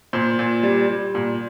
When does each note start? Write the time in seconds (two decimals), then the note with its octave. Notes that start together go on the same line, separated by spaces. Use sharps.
0.13 A#2 C5
0.39 A#2
0.63 G3
0.89 G3
1.15 A#2